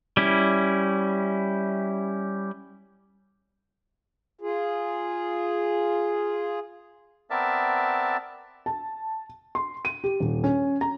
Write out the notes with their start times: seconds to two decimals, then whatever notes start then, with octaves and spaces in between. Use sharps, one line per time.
0.17 G3 C#4 E4
4.41 F4 G#4
7.30 B3 C4 A#4 D5 E5 A5
8.66 A5
9.55 C6
9.85 D#7
10.04 G4
10.20 D#1
10.44 C#4
10.81 A#5